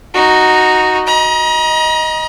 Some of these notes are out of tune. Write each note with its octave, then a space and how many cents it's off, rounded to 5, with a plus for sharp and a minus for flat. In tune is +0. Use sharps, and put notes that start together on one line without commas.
D#4 +0 F#4 +0
D#5 +10 A#5 +40